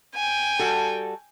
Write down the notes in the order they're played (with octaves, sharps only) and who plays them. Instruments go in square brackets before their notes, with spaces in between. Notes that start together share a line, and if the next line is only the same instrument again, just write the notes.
[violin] G5 G#5
[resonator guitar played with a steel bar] G3 F#4 A4